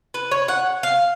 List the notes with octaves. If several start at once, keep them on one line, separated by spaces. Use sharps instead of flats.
B4
C#5
F#5
F5